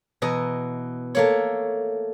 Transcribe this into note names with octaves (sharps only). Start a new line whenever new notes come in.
B2 E3 D#5 A#5
A3 A#3 C#5